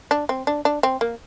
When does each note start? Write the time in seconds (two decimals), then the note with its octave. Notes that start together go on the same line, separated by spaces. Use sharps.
0.11 D4
0.29 C4
0.47 D4
0.65 D4
0.83 C4
1.01 A#3